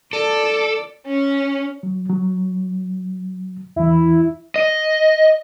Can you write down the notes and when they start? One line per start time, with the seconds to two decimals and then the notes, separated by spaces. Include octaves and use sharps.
0.13 A4 D5
1.06 C#4
1.83 F#3
2.09 F#3
3.76 E2 E3 E4
4.56 D#5